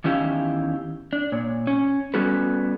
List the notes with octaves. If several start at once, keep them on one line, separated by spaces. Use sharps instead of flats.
E2 D#3 C#4 E4 G4 F5
D4
A#2 C#5
C#4
G3 B3 C#4 F#4 A4 B4